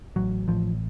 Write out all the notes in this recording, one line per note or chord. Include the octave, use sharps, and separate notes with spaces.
A1 F#3
A1 F3